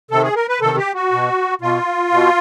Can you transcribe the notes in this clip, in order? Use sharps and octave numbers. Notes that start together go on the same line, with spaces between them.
C3 D#3 A4
G#4
A#4
B4
C3 D#3 A4
G4
F#4
B2
B2 F4
B2